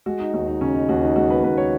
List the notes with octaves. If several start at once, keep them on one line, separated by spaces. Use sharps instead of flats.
G#3 F#4
D#4
D#2 F#4
D#4
C#3 C#4
D#4
D#2 F#4
D#4
G#3 F#4
B4
D#2 B4
C#5